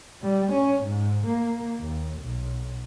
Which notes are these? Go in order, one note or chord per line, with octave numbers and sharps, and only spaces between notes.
G3
C#4
G#2
A#3
D#2
B1